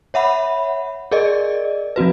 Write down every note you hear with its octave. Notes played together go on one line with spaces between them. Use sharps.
C#5 E5 F#5 B5
G#4 A#4 D5 D#5
F3 C4 F#4 B4